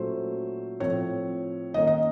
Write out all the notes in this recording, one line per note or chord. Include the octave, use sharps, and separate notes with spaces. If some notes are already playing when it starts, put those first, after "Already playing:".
Already playing: A#2 F#3 A3 C#4 C5
A2 F3 C4 C#5
D#3 A#3 C#4 D#5
D#5